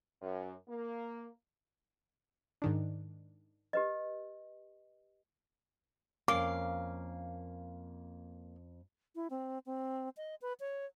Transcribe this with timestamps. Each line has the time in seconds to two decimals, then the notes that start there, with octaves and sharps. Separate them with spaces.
0.22 F#2
0.69 A#3
2.62 G#2 D#3 D4
3.73 G4 B4 D#5
6.28 F2 A#3 C#4 F5 D6
9.15 E4
9.30 C4
9.66 C4
10.17 D#5
10.42 B4
10.60 C#5